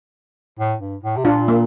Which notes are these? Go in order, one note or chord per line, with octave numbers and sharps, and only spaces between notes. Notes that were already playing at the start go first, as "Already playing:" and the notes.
A2
G2
A2
C3
A#2 D4 F4
A#3